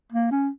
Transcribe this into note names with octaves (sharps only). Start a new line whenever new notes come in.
A#3
C#4